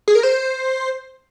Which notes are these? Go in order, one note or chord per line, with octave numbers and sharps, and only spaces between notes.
G#4
A#4
C5